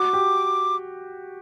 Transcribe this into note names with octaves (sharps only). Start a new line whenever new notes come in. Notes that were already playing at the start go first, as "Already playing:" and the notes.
Already playing: F#4 D6
G4